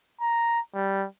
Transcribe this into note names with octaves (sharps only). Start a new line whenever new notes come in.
A#5
G3